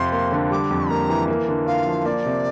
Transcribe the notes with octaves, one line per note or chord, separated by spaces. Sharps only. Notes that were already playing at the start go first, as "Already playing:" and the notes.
Already playing: F2 C3 F3 C6
A#3
D3
G3 D6
F2
A#3 A#5
E3
A#3
D3
F4 F5
F3
A#3 D5
C3